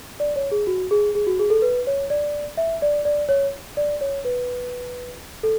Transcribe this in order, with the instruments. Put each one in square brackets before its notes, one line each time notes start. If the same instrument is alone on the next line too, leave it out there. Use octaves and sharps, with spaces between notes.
[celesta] D5
C#5
G#4
F#4
G#4
G#4
F#4
G#4
A4
B4
C#5
D5
E5
D5
D5
C#5
D5
C#5
B4
A4